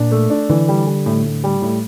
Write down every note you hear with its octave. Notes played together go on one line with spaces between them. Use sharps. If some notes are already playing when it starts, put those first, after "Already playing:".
Already playing: A#2 D4
A3
D4
D3 E3
G3
G3
A2
A2
G3
A2